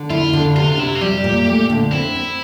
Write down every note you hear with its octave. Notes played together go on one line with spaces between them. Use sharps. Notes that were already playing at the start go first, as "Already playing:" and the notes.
Already playing: D3
E4 F4
D3
C3 F4
F4
C3 E4
F4
G3 G4
A#2
A3
D3
C4 E4
C4